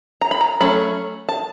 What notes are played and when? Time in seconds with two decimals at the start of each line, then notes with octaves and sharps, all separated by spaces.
0.21 A#5
0.31 B5
0.41 A#5
0.60 F#3 A3 C#4 B5
1.29 A5